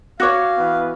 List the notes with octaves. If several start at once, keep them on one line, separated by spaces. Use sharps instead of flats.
F#4 C#5 F5 C#6 D6 A#6
E3 B3 B4